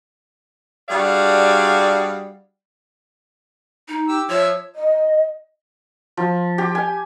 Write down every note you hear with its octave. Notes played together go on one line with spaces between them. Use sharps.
G3 D4 F#4 G#4 D5 F5
D#4
G4 E6
F3 C#5 E5 E6
D#5
F3
G4
G#5